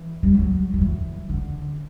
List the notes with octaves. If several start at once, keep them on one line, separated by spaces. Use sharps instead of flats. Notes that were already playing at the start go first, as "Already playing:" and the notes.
Already playing: E3
G3
F#3
F#3
E3
D3